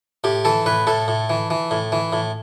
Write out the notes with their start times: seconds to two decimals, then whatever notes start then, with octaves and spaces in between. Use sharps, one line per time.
0.24 A2 G4
0.45 E3 A4
0.66 A2 B4
0.87 A2 A4
1.08 A2
1.30 E3
1.50 E3
1.71 A2
1.92 E3
2.13 A2